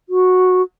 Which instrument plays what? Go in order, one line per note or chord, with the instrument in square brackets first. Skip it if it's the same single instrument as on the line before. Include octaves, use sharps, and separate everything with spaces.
[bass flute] F#4